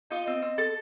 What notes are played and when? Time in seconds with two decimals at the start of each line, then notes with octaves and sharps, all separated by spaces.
0.11 D#4 F4 D#5
0.27 C4
0.42 C4
0.58 A4